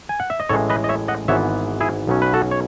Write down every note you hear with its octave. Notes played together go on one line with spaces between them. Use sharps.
G#5
F#5
E5
D#5
A1 A2 E3 G#3 A4 C#5
B4 D#5
D#5
C#5 E5
D#5 F#5
G#1 G#2 E3 B3 C#5 E5
E4 G#4
B1 B2 F#3 C#4
B4
F#4 A4
C#5